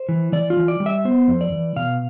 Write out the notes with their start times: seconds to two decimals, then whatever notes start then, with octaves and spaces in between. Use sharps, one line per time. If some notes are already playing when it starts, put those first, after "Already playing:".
Already playing: C5
0.09 E3
0.32 E3 D5
0.50 F4
0.57 E3
0.68 D5
0.80 G3
0.86 E5
1.05 B3 C5
1.28 F2
1.41 D5
1.52 E3
1.76 B2 F5